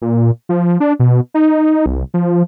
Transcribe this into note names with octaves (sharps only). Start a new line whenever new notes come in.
A#2
F3
D4
B2
D#4
C2
F3